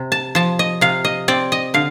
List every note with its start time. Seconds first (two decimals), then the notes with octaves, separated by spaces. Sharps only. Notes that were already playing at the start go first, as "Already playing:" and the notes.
Already playing: C3
0.12 A5
0.35 F3 A5
0.59 D#5
0.81 C3 F5
1.05 D#5
1.28 C4 D5
1.52 D#5
1.74 D3 F5